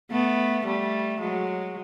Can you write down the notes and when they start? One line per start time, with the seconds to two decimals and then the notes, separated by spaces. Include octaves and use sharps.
0.11 A3 B3
0.66 G3 A3
1.21 F#3 G#3